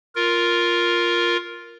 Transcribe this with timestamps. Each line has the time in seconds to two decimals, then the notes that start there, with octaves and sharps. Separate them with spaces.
0.15 F4 A#4